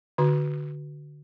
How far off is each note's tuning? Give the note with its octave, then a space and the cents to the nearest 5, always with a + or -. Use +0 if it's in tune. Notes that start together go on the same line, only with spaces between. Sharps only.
D3 +5 F#4 +0 A#5 +25